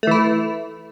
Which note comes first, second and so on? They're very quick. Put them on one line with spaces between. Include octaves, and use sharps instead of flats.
A3 E3 E4